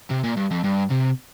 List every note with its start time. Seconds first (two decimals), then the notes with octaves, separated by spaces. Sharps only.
0.11 C3
0.24 A#2
0.37 G2
0.51 F2
0.64 G2
0.91 C3